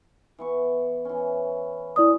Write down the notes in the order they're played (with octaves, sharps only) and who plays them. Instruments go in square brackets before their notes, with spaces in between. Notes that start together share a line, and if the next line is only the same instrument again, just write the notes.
[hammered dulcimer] E3 B3 C#6
E3 C#4
[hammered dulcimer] F#3 G#3 C#4 [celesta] E4 D5 D#6